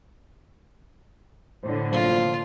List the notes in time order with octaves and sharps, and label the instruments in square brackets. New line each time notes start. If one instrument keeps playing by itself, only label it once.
[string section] A2 D3 [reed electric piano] C5
[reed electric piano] C3 F#3 A#3 [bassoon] F3 [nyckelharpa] F4